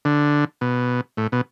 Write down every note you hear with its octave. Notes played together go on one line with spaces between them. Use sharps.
D3
B2
A2
B2